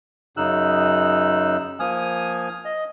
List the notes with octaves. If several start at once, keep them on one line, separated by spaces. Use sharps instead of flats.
F#2 C#3 D#4 E6 F#6
F3 A#3 G#5 D#6 F6
D#5